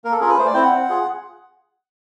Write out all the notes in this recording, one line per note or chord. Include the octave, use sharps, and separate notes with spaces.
A#3 A#4
A4
C#4 F4 G#4 A#4
B4
A3 C5
D5
C4 E4 G5
F#5
C4
F4 G#4